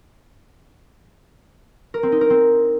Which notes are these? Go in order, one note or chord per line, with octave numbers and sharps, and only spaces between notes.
A#4
C4
D#4
A#4
C4